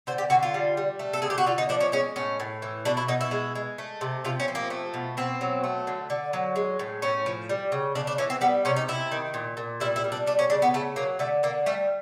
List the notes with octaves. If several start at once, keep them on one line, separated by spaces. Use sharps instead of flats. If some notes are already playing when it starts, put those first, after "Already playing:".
D3 C5
G4
D3 F#4
F4
G3
G3
A3
A4
D3 G#4
G4
F#4
D3 F4
D#4
F3 D4
C#4
G#3 C#4
A2 C#4
A2
E3
B2 D4
E4
B2 D#4
E4
G#3
G#3
A3
C3
C3 F4
C#4
F3
A#3
A3
B2
B2 C4
F#3
A3
D3
D3
F#3
G#3
A2
A2 C#4
F3
G3
C#3
C#3 D4
D4
E3 C#4
C4
G3 B3
C3 C#4
D#4
C3 E4
D#3
A#2
A#2
G3 E4
E4
G3
D4
A3 D4
C#4
C#3 D4
B3
C#3 A3
F#3 A#3
D3 A3
D3 A#3
G3 A3